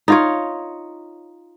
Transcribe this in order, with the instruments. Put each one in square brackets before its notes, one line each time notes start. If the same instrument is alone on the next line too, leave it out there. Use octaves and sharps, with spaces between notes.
[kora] D#4 F4 C#5